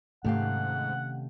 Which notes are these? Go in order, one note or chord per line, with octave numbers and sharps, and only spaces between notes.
G#2 C3 D#3 A3 C#4 G4 F5 F#5